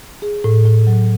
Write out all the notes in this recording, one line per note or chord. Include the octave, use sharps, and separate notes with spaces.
G#4
A2
A2
F#3